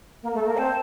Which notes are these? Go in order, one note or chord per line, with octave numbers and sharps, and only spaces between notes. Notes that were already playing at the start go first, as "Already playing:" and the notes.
A#3 A#4
A3 A4
A#3 A#4
C4 A5